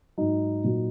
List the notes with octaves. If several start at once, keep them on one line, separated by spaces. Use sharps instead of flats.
G#2 F#3 D#4
A#2 F#3